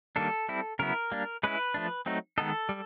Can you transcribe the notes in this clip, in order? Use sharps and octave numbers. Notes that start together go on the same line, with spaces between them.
D#3 G3 A#3 D4 A4
G3 C4 E4
C#3 F#3 B3 E4 A#4
G3 A#3 D4
G#3 C#4 E4 B4
F3 A3 D4
F#3 A3 C4 D#4
D#3 G#3 B3 D#4 A4
G3